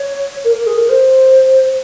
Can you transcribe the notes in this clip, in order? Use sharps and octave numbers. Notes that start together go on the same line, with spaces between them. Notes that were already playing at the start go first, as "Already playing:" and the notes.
Already playing: C#5
A#4
A#4
G#4
A#4
C5